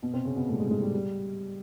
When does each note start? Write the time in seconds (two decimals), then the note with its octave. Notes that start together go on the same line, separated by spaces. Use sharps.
0.02 B2 B3
0.13 C3 C4
0.25 C#3 C#4
0.36 B2 B3
0.48 A2 A3
0.54 G3
0.59 G#2 G#3
0.70 G#2 G#3
0.82 G3
0.94 G3